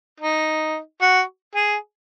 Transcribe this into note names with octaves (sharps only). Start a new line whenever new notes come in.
D#4
F#4
G#4